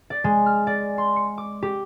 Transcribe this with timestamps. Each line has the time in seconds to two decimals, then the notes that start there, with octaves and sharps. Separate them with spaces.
0.10 D5
0.24 G#3
0.46 F6
0.67 D5
0.98 C6
1.16 C#7
1.38 D6
1.63 G4